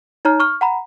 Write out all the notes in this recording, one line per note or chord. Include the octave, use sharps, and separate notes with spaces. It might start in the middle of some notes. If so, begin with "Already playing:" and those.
D#4 C#5 A#5 F6
C#6 F6
F#5 A#5 B5